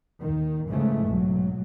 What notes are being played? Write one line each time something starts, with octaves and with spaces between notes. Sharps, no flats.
D#2 D#3
G#2 C#3 E3 F3 G#3 A3
B1 G#2 F#3